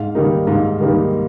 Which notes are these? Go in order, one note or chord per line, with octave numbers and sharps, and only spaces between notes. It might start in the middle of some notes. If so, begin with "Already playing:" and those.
Already playing: G#2 F5
D#3 G3 A#3 D#4
G#2 F5
D#3 G3 A#3 D#4